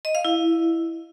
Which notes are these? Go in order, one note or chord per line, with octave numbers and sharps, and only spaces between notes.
D#5
F5
E4